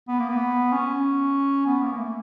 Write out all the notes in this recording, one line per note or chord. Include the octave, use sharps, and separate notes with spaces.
B3
A#3
B3
C#4
B3
A#3
A#3
A3